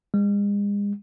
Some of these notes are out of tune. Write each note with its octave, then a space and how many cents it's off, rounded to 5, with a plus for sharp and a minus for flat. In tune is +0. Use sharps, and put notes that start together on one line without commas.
G#3 -40